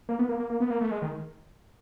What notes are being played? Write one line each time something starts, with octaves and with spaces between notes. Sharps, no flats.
A#3
B3
A#3
A#3
A#3
B3
A#3
A3
G#3
D#3